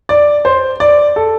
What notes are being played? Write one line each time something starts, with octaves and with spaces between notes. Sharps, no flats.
D5
C5
D5
A4